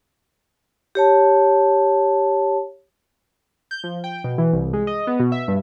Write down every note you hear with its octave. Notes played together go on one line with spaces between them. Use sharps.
G4 C#5 A5
G6
F3
G5
B2
E3
C2
G#3
D#5
B3
B2
E5
G2